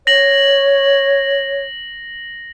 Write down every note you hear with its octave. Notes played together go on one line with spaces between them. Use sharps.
C#5 A#6 F#7